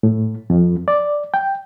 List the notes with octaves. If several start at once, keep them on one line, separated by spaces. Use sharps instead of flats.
A2
F2
D5
G5